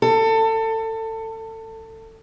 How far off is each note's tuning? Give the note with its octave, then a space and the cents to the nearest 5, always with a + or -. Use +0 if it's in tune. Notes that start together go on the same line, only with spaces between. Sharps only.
A4 +25